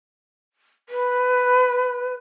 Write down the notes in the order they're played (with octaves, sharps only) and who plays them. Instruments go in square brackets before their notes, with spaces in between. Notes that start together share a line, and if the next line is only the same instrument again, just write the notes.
[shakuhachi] B4